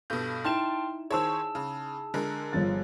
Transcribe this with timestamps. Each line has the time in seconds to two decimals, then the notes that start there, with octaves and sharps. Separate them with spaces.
0.10 G2 B2 A4 G6
0.45 D#4 E4 G5 A5 C6 F6 E7
1.11 D#3 G#4 C5 C#5 A5 E6
1.55 C#3
2.14 D3 G#3 A#4
2.53 G1 F3 A6